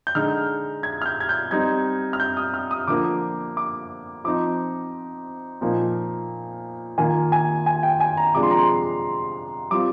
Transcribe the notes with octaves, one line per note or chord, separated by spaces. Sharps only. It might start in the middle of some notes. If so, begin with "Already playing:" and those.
G6
D3 G#3 D#4 F6
G#6
F6
G6
G#6
G6
G3 C4 D#4 G#6
F6
G6
D#6
F6
D#6
D3 F3 A#3 D6
D6
F3 C4 D#4 D6
A#2 F3 A#3 D#4
D#3 A#3 F4 G#5
G#5
G#5
G5
G#5
A#5
C3 F3 G#3 D4 F4 D6
C6
A#5
C6
G3 C4 F4 D6